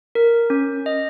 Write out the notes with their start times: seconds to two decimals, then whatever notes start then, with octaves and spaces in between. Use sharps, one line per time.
0.15 A#4
0.50 C#4
0.86 D#5